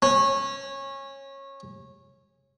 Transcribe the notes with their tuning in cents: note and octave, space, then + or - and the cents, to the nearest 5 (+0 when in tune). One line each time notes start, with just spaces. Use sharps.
C#4 -20